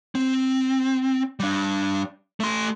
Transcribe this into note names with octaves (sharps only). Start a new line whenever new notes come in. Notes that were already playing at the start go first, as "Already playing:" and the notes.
C4
G3 D4
A3 C6